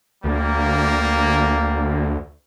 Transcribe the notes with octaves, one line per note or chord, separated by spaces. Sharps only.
D2 G3 A#3